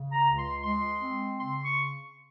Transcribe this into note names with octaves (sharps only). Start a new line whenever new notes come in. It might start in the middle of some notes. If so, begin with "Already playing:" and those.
Already playing: C#3
A#5
C#2
C6
G#3 C6
C4
C#3 C6
C#6